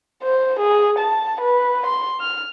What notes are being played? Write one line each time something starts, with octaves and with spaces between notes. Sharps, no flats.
C5
G#4
A5
B4
C6
F6